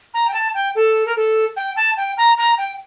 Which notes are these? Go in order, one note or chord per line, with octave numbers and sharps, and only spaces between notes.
A#5
G5
A5
G5
A4
A#4
A4
G5
A5
G5
A#5
A#5
G5